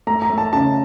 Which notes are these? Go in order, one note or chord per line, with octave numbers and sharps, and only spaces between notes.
A3 A#5
A#5
A3
A5
C#3 A5